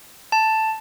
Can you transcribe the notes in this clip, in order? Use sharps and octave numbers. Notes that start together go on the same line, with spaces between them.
A5